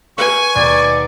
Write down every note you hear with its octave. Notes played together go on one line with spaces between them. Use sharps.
G4 A#4 B4 G#5 C#6
D#2 B2 G#3 D5